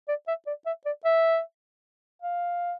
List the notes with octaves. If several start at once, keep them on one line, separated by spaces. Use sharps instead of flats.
D5
E5
D5
E5
D5
E5
F5